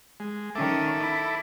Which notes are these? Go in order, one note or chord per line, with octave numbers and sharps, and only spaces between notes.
G#3
D#3 C#4 A4 E5 D6
E4